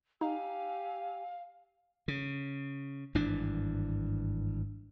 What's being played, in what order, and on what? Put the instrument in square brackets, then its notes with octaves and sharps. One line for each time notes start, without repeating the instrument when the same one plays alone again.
[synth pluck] D#4 [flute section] G4 G#5 E6 [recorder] F5
[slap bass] C#3
G#1 G2 E3 D4